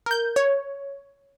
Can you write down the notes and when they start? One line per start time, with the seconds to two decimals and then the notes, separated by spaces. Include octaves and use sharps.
0.06 A#4 G6
0.36 C#5